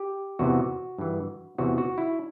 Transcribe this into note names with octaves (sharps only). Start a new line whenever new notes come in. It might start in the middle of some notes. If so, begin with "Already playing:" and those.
Already playing: G4
E2 C3 E3 F#4
G2 E3
E2 C3 E3 F#4
F#4
E4